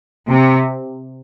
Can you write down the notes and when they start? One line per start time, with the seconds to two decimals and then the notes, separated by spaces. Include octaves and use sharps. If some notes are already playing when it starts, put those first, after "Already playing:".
0.29 C3